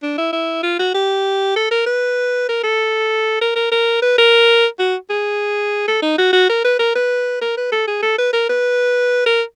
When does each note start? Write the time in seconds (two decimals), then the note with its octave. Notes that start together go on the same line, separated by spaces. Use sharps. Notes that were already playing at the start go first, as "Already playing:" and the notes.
0.03 D4
0.18 E4
0.32 E4
0.63 F4
0.79 F#4
0.94 G4
1.56 A4
1.71 A#4
1.86 B4
2.48 A#4
2.63 A4
3.41 A#4
3.56 A#4
3.72 A#4
4.02 B4
4.18 A#4
4.79 F#4
5.10 G#4
5.87 A4
6.02 D#4
6.18 F#4
6.33 F#4
6.49 A#4
6.64 B4
6.79 A#4
6.95 B4
7.41 A#4
7.57 B4
7.72 A4
7.87 G#4
8.02 A4
8.18 B4
8.33 A#4
8.49 B4
9.26 A#4